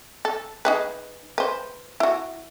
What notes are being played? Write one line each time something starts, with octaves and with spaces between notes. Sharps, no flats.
A4
D#4 G#4 B4
B4 C5
E4 F#4